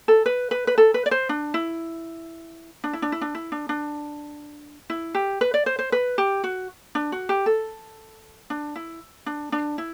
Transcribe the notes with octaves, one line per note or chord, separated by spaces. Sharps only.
A4
B4
B4
B4
A4
B4
D5
C5
D4
E4
D4
E4
D4
E4
D4
E4
D4
D4
E4
G4
B4
D5
C5
C5
B4
G4
F#4
D4
F#4
G4
A4
D4
E4
D4
D4
E4